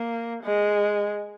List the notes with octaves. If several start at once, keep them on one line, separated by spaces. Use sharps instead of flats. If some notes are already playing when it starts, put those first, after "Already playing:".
Already playing: A#3
G#3